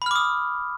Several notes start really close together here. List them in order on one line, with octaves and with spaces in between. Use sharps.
B5 F6 D6 D#6